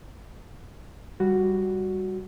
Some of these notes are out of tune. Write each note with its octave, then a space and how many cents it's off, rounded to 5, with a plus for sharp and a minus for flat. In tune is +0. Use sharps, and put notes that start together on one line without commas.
G3 +0 F#4 +0